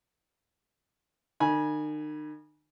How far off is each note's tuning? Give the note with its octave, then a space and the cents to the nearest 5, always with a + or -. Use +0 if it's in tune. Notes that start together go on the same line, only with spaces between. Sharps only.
D#3 -40 G#5 +0 B5 -30